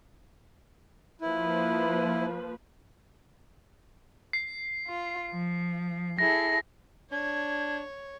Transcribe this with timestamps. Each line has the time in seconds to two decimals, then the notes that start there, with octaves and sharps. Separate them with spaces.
1.21 F3 A#3 E4 B4
4.33 C7
4.86 F4
5.31 F3
6.19 E4 G#4 A4 A#6
7.12 D4 C#5 G#6